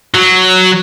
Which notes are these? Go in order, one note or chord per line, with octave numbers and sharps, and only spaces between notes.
F#3